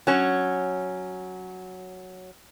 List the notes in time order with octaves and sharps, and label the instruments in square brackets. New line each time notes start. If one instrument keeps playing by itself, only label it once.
[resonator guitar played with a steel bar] F#3 C#4